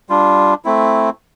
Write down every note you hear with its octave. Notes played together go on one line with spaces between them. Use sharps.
G3 D4 F4
A3 C4 E4